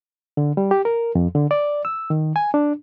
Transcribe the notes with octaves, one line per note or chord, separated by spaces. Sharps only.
D3
G3
G4
A#4
F2
D3
D5
E6
D#3
G#5
D4